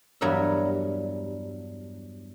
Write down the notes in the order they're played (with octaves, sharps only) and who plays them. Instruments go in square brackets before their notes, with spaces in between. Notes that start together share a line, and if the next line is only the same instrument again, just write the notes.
[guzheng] E2 G2 F#3 G3 A#4 E5